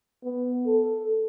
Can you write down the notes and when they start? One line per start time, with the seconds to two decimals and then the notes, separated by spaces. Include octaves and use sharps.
0.24 B3
0.66 A4